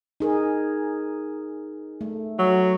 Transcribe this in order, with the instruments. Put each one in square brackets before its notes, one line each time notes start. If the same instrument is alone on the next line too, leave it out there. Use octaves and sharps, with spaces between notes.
[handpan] D#4 G#4 A#4
A3
[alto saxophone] F#3